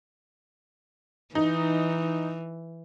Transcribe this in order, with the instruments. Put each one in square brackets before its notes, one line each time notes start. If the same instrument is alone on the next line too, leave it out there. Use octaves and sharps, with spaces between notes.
[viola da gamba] E3 [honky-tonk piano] D#4